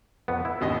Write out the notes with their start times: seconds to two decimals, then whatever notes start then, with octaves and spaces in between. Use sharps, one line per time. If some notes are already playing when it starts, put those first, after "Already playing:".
0.28 F2 B3
0.45 E4
0.61 G#1 D#2 D#5